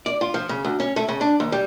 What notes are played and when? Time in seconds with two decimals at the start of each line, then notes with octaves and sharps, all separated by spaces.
0.06 D5
0.21 F4
0.34 F3
0.49 C#3
0.64 D2
0.80 C#4
0.96 A3
1.08 C#3
1.21 D4
1.40 D#2
1.52 G3